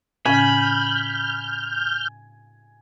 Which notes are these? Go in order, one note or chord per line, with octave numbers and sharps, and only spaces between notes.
A2 C#3 C#4 G#5 B5 F6 G6